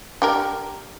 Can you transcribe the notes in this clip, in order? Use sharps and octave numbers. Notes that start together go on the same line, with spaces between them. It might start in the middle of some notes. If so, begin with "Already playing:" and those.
D4 G4 A#4